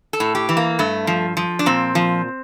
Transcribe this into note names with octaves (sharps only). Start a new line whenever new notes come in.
A4
A2
G4
E3
A#3
G2 A3
F3
F3
D4
A#2 C4
F3